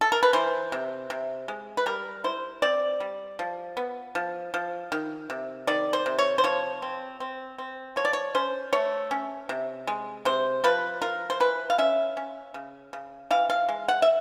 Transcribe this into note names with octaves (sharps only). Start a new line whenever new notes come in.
A4
A#4
B4
E3 C5
C3
C3
G#3
B4
G3 A#4
E4 C5
C4 D5
G3
F3
B3
F3
F3
D#3
C3
D#3 D5
C5
C3
C#5
C5
F3 C#5
C4
C4
C4
F3 C#5
D5
C#5
C#4 C5
A3 C#5
C#4
C3
G#3
C3 C5
F3 B4
F4 A#4
C5
E3 B4
F5
C#4 E5
C#4
C#3
C#3
E3 F5
F5
G#3
F#5
E5